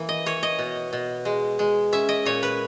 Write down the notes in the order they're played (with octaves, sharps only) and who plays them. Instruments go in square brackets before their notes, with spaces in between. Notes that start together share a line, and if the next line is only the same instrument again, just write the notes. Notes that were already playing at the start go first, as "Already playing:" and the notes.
Already playing: [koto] E3 A#3
D#5
E3 C#5
D#5
B2
B2
G#3
G#3
C#4 E5
D#5
A#2 C#5
B4